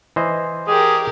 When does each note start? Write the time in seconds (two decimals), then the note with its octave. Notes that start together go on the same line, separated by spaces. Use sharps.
0.16 E3 C5 D#5
0.68 G4 G#4 A#4